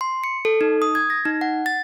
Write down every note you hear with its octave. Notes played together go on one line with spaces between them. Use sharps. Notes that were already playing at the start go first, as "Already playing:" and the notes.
C6
C#7
A4
D#4
D#6
G#6
A#6
D#4
F#5
A6